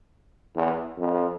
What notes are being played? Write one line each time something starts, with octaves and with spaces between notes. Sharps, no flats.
E2
F2